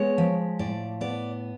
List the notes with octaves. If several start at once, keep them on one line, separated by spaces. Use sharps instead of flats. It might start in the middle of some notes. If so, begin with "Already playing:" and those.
Already playing: G#3 B3 C#5
F3
A2 D5
B3 D5